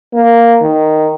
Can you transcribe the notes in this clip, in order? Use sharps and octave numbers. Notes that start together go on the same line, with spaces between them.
A#3
D#3